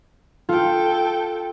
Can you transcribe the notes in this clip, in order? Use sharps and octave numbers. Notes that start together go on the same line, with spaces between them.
F4 A4 G5